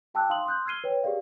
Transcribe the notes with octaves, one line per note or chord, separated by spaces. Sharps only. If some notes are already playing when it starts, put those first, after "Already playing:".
F#4 G5 A5 D6 E6 F#6
D#4 F5 C6 D#6 F#7
C6 D#6 F#6 G6
E6 F6 G#6 C7 D#7 G7
B4 C#5 G5
G4 G#4 A#4 D5 F5